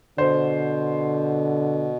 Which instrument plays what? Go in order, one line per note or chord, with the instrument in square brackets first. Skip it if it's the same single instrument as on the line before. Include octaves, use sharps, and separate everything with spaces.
[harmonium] B2 [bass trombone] D3 [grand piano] C5